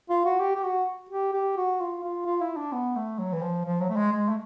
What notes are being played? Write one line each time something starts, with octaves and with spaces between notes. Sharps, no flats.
F4
F#4
G4
G4
F#4
G4
G4
F#4
F4
F4
F4
E4
D4
B3
A3
F#3
E3
F3
F3
F#3
A3
G#3
G#3
A3